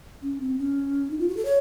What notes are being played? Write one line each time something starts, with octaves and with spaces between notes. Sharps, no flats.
C#4
C4
C#4
D#4
F4
F#4
A4
C#5